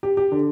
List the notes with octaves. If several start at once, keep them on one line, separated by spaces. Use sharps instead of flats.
G4
G4
D3